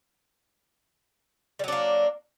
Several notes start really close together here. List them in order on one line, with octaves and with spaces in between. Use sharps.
G3 F#3 D4 A#3